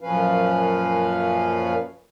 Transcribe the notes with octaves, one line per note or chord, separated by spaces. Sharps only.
F#2 A#2 F3 C#4 B4 F5